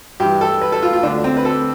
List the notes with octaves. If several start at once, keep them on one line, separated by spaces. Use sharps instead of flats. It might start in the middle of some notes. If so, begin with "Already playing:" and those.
G2 E3 G4
A4
B4
A4
F4
F4
D2 D3 D4
C4
B4
A4